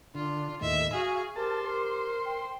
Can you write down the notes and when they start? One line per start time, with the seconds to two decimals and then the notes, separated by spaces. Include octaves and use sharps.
0.15 D3 D4 F4
0.61 D#2 A2 D#5 E5
0.93 F#4 G#4 F5 G#5
1.36 G4 A#4 C5 A5
1.65 A#4 C6
2.25 G5